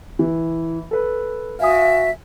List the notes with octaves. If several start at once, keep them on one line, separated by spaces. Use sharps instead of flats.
E3
A4 B4
F#4 E5 F5 G#5 D#6